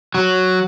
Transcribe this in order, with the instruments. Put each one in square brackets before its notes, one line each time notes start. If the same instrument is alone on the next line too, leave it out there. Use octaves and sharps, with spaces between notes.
[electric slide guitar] F#3